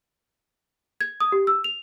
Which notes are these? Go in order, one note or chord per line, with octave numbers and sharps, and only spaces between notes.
G#6
D#6
G4
E6
F7